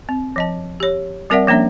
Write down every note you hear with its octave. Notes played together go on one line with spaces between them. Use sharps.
C4
F3 D#5 A5
G4 C#5
G3 C4 A#4 D5 E5 F#5
F3 A#3 C#4 D4 E5